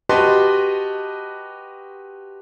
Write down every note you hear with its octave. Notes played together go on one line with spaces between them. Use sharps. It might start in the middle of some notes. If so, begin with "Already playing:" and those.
F#4 G4 B4 D#5 A5 C6